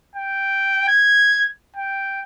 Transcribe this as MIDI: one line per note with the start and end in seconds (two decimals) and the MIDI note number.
0.15 0.87 79
0.88 1.47 92
1.76 2.21 79